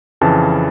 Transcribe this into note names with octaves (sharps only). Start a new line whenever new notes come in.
F2 C#3 E3 A5